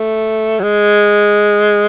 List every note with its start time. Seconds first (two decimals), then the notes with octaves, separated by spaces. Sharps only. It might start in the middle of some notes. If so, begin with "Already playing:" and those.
Already playing: A3
0.59 F#3
0.63 G#3